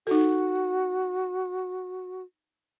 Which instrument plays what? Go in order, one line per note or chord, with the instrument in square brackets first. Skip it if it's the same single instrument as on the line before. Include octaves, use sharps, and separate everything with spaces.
[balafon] D#4 A4 [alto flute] F#4